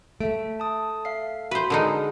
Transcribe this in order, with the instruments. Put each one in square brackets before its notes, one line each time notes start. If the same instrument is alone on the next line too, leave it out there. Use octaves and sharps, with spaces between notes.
[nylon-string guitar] A3 [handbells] E5 D7
[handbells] A5 D#6
E5 F5 C7
[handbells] F#4 [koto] B4 C5
[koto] D3 G#3 D#4 [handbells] G#4 A#4